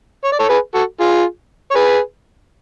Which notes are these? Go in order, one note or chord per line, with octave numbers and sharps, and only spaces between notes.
C#5
D5
A4 C#5
G#4 B4
F#4 A4
F4 G#4
C#5
G#4 B4